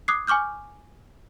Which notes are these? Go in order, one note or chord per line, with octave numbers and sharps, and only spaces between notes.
D6 D#6 F#6 G#6 C7
G#5 C#6 D6 F6 G6